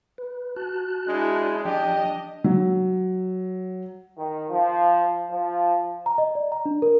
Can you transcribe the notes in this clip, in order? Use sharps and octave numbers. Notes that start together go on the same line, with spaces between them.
B4
F#4 A5 F#6
G#3 D4 E4
F3 D4 G4 D#5
F#3
D#3
F3
F3
A#5
D#5
D5
A#5
D4
A#4